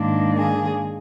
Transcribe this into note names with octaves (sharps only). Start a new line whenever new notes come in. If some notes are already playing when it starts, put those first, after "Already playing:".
Already playing: G#2 D#3 A#3 D4
G#4